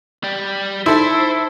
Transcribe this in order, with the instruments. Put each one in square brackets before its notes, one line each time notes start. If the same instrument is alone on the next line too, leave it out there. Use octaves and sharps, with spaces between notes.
[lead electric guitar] G3 G4
[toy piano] D#4 [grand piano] E4 A4 [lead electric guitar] C5